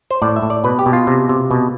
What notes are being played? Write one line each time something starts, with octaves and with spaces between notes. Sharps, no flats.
C5
A2 D5
E5
A2
D5
B2 B4
G4
B2
F4
C3
C3
B2